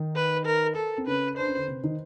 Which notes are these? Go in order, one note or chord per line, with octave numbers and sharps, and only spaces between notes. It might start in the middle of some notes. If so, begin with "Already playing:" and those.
Already playing: D#3 D#4
B4
A#4
A4
C4
C#3 C#4 B4
D4 C5
C#4
D3 D4
C3 C4
D#3 D#4